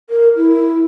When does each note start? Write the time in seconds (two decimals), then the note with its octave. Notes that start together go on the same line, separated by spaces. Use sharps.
0.10 A#4
0.37 E4